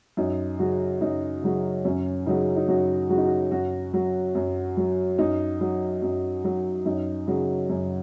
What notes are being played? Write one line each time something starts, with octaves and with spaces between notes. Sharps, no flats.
F#2 D#4
C#3 F#3 F#4
F#2 D#4
C#3 F#3
F#2 C#4
C#3 F#3 D#4
D#4
F#2 F#4
C#3 F#3 F#4
D#4
F#4
F#2 F#4
F#3
F#2
F#3
F#2 D#4
F#3
F#2
F#3
F#2 D#4
C#3 F#3
F#2